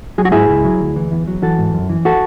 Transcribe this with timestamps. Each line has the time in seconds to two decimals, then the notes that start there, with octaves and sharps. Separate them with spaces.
0.18 F#3 G#4
0.25 F#4
0.32 G#2 E4 G#4
0.49 C#2
0.65 F#3
0.80 D2
0.96 E3
1.12 E2
1.28 F#3
1.43 E3 F#4 A4
1.58 G#2
1.74 F#2
1.89 E3
2.05 F#4 A4